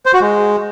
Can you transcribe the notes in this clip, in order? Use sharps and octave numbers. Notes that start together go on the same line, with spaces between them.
C5
F#4
G#3